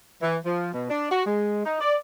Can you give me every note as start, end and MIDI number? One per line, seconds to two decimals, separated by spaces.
0.22 0.37 52
0.45 0.69 53
0.73 0.85 47
0.89 1.09 62
1.11 1.25 66
1.26 1.63 56
1.65 1.77 63
1.81 1.95 74